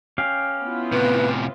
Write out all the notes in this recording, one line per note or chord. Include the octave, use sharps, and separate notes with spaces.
C#4 G4 F5
B3 E4 F4
A2 C3 B4